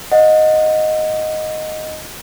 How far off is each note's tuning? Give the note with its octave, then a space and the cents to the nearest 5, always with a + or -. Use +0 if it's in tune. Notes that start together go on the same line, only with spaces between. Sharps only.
D#5 +0 F#5 -30